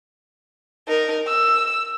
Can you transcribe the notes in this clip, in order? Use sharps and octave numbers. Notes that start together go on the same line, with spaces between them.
D#4 A#4
E6